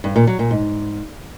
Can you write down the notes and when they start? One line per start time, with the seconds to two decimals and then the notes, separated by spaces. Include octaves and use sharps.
0.04 G2
0.16 A#2
0.27 F#3
0.39 A#2
0.51 G#2